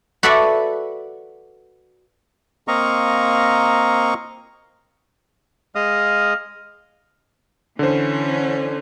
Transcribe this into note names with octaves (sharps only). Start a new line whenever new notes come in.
F#4 A4 B4 D5 E5 F#5
A#3 C4 D#5 F5 A#5 C#6
G#3 D#5 F5 D#6
D3 E3 C#4 C5